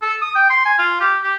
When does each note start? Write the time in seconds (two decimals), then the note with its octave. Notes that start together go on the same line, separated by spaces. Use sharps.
0.02 A4
0.22 D#6
0.36 G5
0.50 C6
0.65 G#5
0.79 F4
1.01 G4
1.23 G4